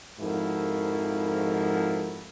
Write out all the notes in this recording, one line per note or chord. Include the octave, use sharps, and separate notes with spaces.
F2 G#2 F3 E4 F#4 A#4